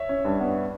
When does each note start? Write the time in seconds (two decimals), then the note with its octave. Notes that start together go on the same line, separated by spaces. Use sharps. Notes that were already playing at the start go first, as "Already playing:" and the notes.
Already playing: C#5 E5
0.09 C#4
0.25 G2
0.40 B3